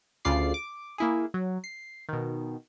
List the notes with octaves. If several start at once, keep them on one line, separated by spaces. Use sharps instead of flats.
D2 C#3 F4 D5 C7
D6
A#3 E4 G#4
F#3
C7
B2 D#3